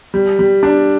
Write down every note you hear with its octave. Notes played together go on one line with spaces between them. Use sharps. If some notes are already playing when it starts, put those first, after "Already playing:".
G3
G3
D4